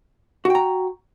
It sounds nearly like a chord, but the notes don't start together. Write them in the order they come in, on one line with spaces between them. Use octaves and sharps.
F#4 G5 A#5